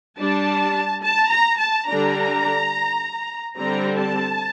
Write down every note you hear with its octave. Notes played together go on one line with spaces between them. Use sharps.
G3 D4 A5
A5
A#5
A5
D3 G3 D4 A#5
D3 G3 C4 A#5
A5